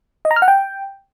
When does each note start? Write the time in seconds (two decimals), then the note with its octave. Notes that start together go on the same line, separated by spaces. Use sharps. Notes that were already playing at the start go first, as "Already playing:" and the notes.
0.25 D#5
0.31 A#5
0.36 F6
0.42 F#5
0.48 G5